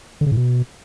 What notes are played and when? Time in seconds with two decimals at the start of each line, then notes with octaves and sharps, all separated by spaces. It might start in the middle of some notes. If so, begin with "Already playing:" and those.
0.21 D3
0.26 C#3
0.32 A2
0.37 B2